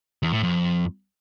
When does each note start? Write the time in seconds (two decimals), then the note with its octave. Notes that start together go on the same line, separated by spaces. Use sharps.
0.23 E2
0.33 A2
0.43 F2